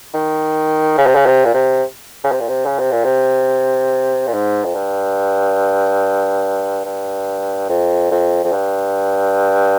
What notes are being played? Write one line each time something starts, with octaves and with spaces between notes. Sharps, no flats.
D#3
C#3
C3
C#3
C3
A#2
C3
C#3
C3
A#2
C3
C#3
C3
A#2
C3
A#2
G#2
F2
G2
G2
F2
F2
F2
G2